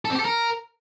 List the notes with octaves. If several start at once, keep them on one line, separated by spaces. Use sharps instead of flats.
A4
C4
G4
A4
A#4